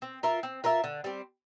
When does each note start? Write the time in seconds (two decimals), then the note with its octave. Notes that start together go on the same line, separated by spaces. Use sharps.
0.02 C4
0.23 F4 A#4 E5
0.43 C4
0.64 F4 A#4 E5
0.84 D3
1.04 G3 C4